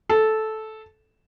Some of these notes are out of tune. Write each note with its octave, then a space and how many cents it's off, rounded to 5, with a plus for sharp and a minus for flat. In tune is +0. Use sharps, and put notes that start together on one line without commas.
A4 -10